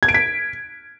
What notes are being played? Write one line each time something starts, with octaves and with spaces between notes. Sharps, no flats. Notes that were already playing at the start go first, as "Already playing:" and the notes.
G#6
D7
B6